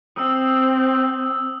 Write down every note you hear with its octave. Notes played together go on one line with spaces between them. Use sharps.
C4 D#6 E6